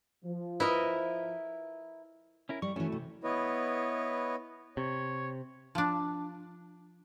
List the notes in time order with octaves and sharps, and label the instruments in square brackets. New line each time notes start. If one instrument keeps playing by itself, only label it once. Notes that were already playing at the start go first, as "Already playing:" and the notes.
[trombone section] F3
[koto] E4 A#4 D#5 [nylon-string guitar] B4
[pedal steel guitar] C#4 E4 A#4
[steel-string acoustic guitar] G3 [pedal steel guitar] C#6
[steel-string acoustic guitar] E3 C#4 [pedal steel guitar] A3 E4 F#4
[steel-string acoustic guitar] C3
[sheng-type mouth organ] B3 E4 B4 C#5 D#5
[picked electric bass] C3 [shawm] C#5
[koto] F3 D4